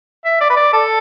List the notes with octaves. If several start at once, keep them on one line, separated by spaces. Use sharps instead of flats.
E5
D5
B4
D5
A4